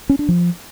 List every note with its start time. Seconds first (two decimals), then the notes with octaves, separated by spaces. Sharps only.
0.09 C#4
0.19 D4
0.29 F3